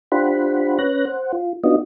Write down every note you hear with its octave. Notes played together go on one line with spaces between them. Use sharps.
D4 F4 G4 C5 F#5 B5
C#4 B4 C#5 F#6 A#6
C5 F#5
F4
B3 D4 D#4 F4 F#4 D#5